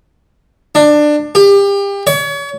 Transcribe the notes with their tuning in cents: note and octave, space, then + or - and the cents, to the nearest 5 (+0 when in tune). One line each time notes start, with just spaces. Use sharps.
D4 +20
G4 +30
C#5 +35